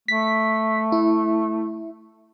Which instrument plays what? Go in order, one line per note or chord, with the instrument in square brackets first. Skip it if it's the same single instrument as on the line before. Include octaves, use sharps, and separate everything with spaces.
[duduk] A3 [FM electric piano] B6
[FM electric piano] E4